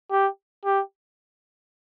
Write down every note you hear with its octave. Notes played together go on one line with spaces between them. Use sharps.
G4
G4